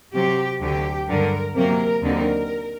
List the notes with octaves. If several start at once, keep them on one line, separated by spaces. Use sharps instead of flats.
C3 F#3 C4 G4
D2 D3 F#3 G4
G2 D3 F#3 A#4
C3 F#3 A#3 A#4
D#2 D3 F#3 C4 D#4 A#4